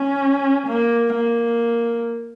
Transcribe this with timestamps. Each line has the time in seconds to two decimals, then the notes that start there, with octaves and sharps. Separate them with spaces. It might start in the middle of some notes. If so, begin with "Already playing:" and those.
Already playing: C#4
0.67 A#3
1.13 A#3